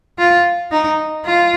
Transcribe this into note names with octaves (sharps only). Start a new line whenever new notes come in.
F4
D#4
F4